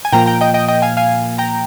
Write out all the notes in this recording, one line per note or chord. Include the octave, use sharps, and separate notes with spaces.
G#5
A#2 F3 A#3 G5 A#5
G5 A#5
D#5 G5
D#5 G5
D#5 G5
F5 G#5
F5 G#5
G5 A#5